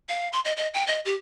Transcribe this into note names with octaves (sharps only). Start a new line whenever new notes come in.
F5
C6
D#5
D#5
G5
D#5
G4